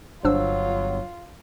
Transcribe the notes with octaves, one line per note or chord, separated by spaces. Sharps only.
G1 F#3 D4 F4 C5 E6